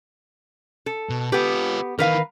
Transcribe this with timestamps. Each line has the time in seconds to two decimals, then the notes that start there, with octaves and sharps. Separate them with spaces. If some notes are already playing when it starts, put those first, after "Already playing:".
0.86 A4
1.09 B2
1.32 B3 F4 G4 B4
1.99 D#3 E3 A#4 B4 F5